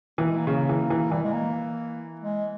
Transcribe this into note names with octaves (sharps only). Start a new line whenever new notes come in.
E3 A#3
G#3
A#3
C#3 A#3
E3
E3
E3 G3
G#3
A#3
G#3